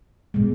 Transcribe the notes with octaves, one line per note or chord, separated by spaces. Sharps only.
B2 G#3